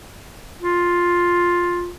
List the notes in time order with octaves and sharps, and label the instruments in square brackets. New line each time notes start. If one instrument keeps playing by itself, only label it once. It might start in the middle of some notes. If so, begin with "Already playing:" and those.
[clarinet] F4